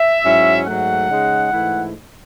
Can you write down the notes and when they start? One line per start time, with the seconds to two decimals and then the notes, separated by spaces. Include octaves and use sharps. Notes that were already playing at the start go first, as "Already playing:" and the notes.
Already playing: E5
0.24 G#2 F#3 C#4 E4
0.66 G#2 F#3 A3 F#5
1.09 C#3 G#3 D#4
1.52 G#2 E3 A3 E4